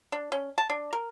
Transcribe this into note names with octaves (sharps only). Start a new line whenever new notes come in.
D4
C#4
A5
D4
A#4